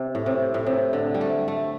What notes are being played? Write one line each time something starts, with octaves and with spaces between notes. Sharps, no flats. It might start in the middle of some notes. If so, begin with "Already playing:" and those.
Already playing: C3
A2
C3
A2
C3
D3
G3
A3
A3